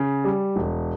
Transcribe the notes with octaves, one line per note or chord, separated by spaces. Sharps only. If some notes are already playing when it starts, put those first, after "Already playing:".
Already playing: C#3
G3
E1